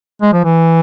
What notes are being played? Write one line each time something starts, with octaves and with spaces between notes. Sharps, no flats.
G#3
F3
E3